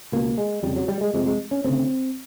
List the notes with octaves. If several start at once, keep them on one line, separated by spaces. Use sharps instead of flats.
C#2 B2 A#3
G#3
F2 C#3 G3
F#3
G3
G#3
F2 C3 G#3
G#3
C#4
D2 C#3 C4